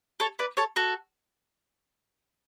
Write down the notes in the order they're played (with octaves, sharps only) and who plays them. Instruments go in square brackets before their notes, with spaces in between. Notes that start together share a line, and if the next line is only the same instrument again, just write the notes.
[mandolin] A4 C#5
B4 D5
A4 C#5
F#4 A4